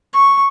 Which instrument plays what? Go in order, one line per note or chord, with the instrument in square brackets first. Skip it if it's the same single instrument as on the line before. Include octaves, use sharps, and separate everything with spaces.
[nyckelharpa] C#6